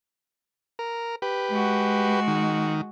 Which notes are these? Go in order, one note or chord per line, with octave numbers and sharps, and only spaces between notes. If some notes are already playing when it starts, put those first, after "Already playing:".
A#4
G4 B4
G#3 F#4
D#3